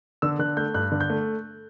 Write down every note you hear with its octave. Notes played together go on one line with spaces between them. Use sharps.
D3 E6
D3 F#6
A3 G6
G2 F#6
D3
G6
A3